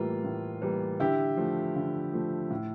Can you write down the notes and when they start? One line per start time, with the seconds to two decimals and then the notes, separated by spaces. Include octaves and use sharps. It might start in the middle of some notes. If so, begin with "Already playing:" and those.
Already playing: A2 E3 G3 A#3 F4
0.24 A2
0.62 E3 G3 A#3
1.00 D3 E4 G4
1.37 F3 A3
1.76 D3
2.13 F3 A3
2.50 A2